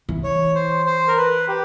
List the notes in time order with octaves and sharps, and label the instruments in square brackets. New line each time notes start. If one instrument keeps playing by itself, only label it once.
[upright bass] E3
[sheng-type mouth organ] C#5
C5
C5
A#4
B4
G4